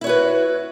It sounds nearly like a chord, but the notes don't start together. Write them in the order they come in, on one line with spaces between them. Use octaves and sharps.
E4 C#5 F#4 B4